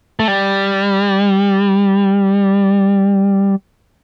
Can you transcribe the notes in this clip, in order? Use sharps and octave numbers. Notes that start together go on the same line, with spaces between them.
A3
G3